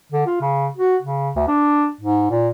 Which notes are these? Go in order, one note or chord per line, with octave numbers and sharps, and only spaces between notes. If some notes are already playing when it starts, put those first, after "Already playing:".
D3
F4
C#3
F#4
C#3
D2
D4
G#2
A#2